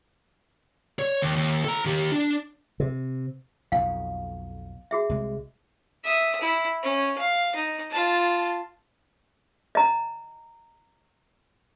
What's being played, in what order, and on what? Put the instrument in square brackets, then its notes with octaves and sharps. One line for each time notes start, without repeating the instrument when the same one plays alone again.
[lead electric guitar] C#5
D#2
D#2
A4 A#5
D#3 G4
D4
[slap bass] C3
[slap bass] B1 F2 B2 [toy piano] F5
[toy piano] F#4 G#4 E5
[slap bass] C2 G#3
[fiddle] E5 D#6
E4
C#4
F5
D#4
F4 A5
[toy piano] D#5 A#5